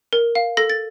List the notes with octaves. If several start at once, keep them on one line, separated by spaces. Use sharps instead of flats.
A#4
F5
A4 A#6
A6